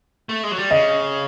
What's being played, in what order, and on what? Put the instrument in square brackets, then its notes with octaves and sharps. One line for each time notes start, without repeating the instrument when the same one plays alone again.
[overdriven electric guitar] A3
G#3
F#3
G3
[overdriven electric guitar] C#3 [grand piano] D#5